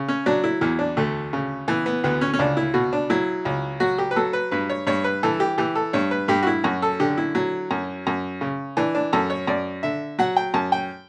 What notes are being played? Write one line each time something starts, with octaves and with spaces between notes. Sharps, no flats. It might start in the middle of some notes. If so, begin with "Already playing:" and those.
Already playing: C#3
C#4
F#3 D4
E4
E2 E4
D4
D2 A3
C#3
E3 B3
B3
D2 B3
C#4
C#4
C#2 D4
E4
B2 F#4
D4
F#3 E4
C#2
F#3 F#4
G4
B4
F#3 A4
B4
G2 B4
C#5
G2 C#5
B4
E3 A4
G4
E3 G4
A4
G2 C#5
B4
G2 G4
F#4
E4
F#2 F#4
A4
D3 G4
E4
F#3
F#2
F#2
C#3
E3 D4
D4
F#2 A4
C#5
F#2 D5
D3 E5
F#3 F#5
G5
F#2 A5
G5